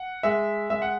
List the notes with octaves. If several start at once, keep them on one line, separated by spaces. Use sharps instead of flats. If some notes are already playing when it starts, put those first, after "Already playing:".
Already playing: F#5
G#3 E5
G#3 E5
F#5